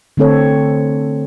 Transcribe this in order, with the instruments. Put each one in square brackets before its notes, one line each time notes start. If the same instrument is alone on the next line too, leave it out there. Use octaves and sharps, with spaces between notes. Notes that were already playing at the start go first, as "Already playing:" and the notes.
[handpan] D3 A3 C4 A4 C#5